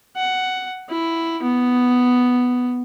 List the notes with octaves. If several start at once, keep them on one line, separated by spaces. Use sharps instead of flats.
F#5
E4
B3